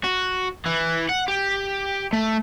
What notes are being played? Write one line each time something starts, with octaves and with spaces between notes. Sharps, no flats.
F#4
E3
F#5
G4
A3